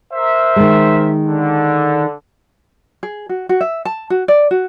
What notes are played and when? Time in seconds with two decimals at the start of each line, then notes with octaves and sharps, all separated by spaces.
0.14 A#4 C5 E5
0.56 D#3 G#3
1.28 D3
3.03 G#4
3.29 F#4
3.49 F#4
3.61 E5
3.85 A5
4.10 F#4
4.28 D5
4.51 F#4